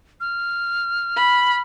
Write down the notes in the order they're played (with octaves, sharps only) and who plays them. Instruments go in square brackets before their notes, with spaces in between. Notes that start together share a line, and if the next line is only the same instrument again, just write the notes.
[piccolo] F6
[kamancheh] B5